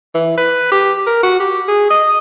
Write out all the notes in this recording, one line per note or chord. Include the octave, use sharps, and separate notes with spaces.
E3
B4
G4
A#4
F#4
G4
G#4
D#5